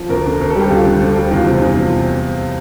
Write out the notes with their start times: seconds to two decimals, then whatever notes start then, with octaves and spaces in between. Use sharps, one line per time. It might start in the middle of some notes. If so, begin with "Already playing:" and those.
Already playing: F3
0.09 D2 A#4
0.25 D3
0.40 D2
0.50 A4
0.55 G3 G4
0.70 D2 F4
0.85 D3
1.01 D2
1.16 G3
1.31 E2 F4
1.46 C3
1.62 E2
1.78 F3